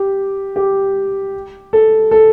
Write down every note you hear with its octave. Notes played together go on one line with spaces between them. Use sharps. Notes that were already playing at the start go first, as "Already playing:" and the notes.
Already playing: G4
G4
A4
A4